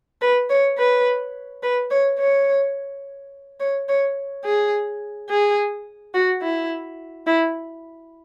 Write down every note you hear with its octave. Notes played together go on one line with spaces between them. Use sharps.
B4
C#5
B4
B4
C#5
C#5
C#5
C#5
G#4
G#4
F#4
E4
E4